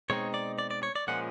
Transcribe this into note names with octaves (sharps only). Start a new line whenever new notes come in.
B2 G#3 C4 D#4 C#5
D5
D5
D5
C#5
D5
A#2 F3 G#3 C#4 F#5